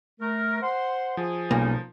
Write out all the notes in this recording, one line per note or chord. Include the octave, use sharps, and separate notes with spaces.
A3 A#4
C5 F#5 C6
F3 G#4
B1 G3 A#3 C#4 D#4